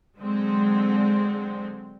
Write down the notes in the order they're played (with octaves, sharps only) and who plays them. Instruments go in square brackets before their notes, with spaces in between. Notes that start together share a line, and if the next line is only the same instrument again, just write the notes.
[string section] D3 F#3 G#3 C4